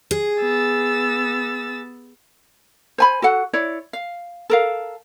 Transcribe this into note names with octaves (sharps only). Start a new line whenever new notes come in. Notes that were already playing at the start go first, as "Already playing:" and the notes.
G#4
B3 E6 A6
C5 G#5 B5
F#4 A4 F#5
E4 C#5 D5
F5
A4 A#4 F5